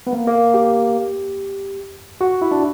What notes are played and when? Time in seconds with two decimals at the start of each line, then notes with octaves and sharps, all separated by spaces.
0.07 B3
0.13 A#3
0.27 A#3
0.54 G4
2.21 F#4
2.42 E4
2.51 D4